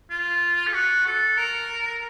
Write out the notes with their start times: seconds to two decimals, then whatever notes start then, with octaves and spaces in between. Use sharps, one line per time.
0.10 F4
0.67 A4
0.74 F#4
1.06 A4
1.37 A#4